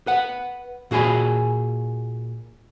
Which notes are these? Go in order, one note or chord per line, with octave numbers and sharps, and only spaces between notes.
B4 F#5
A#2 F#4 G#4 G#5 B5